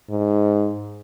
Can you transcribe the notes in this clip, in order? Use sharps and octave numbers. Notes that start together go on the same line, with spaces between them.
G#2